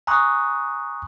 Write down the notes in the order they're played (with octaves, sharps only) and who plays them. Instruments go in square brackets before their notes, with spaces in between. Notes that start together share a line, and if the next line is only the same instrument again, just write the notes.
[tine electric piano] G#5 A#5 C6 C#6 D#6 F#6